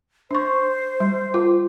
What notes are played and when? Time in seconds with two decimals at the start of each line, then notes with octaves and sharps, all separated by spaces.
0.31 D4 C5 C#6
1.00 G3
1.34 F4